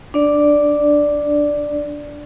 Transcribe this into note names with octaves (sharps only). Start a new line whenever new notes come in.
D4 D5